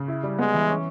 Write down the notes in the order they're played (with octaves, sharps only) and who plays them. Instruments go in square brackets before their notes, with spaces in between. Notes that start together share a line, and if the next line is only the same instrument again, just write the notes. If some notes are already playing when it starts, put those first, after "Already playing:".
Already playing: [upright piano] C#3
E4
G3
[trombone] G#3 [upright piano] B3
[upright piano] E3
C#4